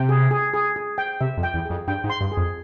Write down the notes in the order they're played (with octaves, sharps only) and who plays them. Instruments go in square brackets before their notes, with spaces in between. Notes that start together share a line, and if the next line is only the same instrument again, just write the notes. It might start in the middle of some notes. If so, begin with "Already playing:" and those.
Already playing: [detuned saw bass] C3 [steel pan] G5
[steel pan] G#4
G#4
G#4
G#4
G5
[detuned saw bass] C3 [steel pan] E5
[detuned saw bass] F2
[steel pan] G5
[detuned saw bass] E2
[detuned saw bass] F2 [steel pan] G#4
[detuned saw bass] G2 [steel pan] G5
[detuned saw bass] G#2
[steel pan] C6
[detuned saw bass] G2
[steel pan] G#4
[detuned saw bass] F2